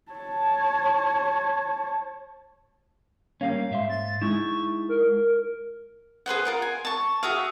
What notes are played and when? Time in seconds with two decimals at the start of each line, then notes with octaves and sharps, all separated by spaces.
0.12 C#5 A5
3.41 G3 A#3 C#4 F5
3.71 G#2 E5 C6
3.89 A6
4.22 G#3 D#4 E4 C#6
4.89 A#4
6.26 G#4 B4 C5 F#5
6.45 F4 A#4 F#5
6.62 G#5
6.85 A5 C#6
7.23 F#4 G#4 E5 F5